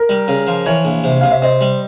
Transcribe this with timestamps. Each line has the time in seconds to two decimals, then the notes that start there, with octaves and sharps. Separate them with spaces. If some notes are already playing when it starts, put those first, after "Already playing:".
Already playing: A#4
0.09 G3
0.28 C#3
0.47 F3
0.66 E3 C#5
0.85 A#1
1.04 C3
1.21 C3 F5
1.31 E5
1.42 C4 D#5
1.61 G3